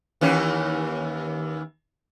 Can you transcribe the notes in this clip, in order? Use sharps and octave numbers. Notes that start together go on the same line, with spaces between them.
D#2 E3 C#4